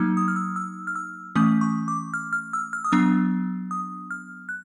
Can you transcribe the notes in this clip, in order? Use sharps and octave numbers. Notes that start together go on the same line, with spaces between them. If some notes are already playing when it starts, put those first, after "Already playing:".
Already playing: F#3 A#3 D#4 F6
D#6
F6
E6
E6
F6
E6
E3 A3 C#4 D#6
C#6
D6
F6
F6
E6
F6
D#6
F#3 B3 D4 E6
D#6
F6
F#6